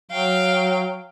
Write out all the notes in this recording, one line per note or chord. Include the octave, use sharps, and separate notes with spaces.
F#3 F5 G5